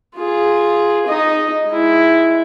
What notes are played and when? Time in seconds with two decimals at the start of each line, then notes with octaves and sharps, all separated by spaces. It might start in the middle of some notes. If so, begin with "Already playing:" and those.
0.17 F4 G#4
1.07 D#4 D#5
1.68 G#3 E4